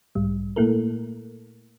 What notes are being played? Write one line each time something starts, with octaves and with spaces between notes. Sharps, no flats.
B1 G#2 G3
A#2 A3 A#3 E4 A4 A#4